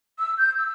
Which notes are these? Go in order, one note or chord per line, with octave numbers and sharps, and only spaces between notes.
E6
G6
E6